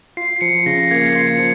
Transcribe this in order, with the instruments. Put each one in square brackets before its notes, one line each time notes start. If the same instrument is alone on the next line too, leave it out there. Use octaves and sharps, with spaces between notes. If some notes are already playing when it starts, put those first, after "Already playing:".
[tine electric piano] F4 [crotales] C7
[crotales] C7
[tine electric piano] F3 [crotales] C#7
[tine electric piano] C#3 [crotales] A#6
[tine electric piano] A#3 [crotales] G#6
[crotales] C7
[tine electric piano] F4
[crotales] C#7
[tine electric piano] F3